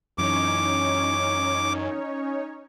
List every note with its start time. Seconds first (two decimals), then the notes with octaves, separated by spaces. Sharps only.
0.18 F#2 E3 C#4 D#4 C#5 D6